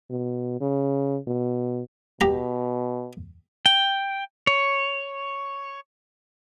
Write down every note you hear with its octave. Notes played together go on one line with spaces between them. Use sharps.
B2
C#3
B2
B2 G4 A#5
G5
C#5